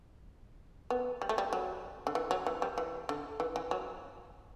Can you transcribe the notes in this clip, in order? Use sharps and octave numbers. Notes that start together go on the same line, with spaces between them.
B3
G3
A3
G3
F#3
D3
E3
F#3
E3
G3
E3
D3
E3
E3
F#3